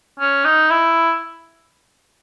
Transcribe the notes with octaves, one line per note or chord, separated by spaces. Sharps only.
C#4
D#4
E4